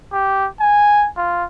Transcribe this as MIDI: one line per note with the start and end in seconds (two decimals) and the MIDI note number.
0.13 0.48 67
0.61 1.07 80
1.17 1.44 65